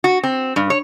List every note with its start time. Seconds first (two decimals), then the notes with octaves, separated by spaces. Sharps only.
0.04 F#4
0.23 C4
0.56 G2
0.70 C#5